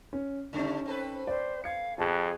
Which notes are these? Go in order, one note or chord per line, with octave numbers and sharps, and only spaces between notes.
C#4
C#3 G3 A3 C#4 D#4
C4 A4 B4
C5 D5
F5 G#6 C#7
F2 G#4 A5 F#6